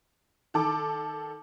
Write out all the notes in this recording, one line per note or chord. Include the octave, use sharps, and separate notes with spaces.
D#3 A4 D6